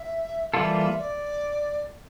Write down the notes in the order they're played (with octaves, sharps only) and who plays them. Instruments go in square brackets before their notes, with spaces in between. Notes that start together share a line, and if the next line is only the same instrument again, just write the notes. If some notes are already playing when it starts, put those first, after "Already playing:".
Already playing: [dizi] E5
[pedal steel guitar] E3 G3 A#3 F4 A4 [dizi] E5
[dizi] D5